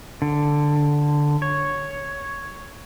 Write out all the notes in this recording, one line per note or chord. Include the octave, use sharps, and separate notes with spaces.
D3
C#5